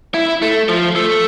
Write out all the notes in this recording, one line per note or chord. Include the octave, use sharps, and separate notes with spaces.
E4
A3
F3
A3